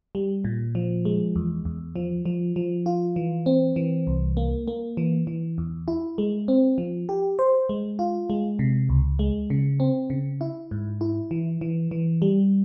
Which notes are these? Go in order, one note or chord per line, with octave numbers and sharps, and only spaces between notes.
G3
A#2
F3
G#3
E2
E2
F3
F3
F3
F4
E3
C4
E3
C2
A#3
A#3
E3
E3
E2
E4
G#3
C4
F3
G4
C5
G#3
F4
G#3
C3
C#2
G#3
C#3
C4
C#3
E4
G#2
E4
E3
E3
E3
G3